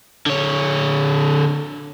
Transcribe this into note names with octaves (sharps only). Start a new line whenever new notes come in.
D3 C#5